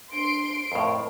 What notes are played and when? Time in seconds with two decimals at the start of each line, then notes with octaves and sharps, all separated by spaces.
0.12 D4 C6 D7
0.72 F2 A2 A#4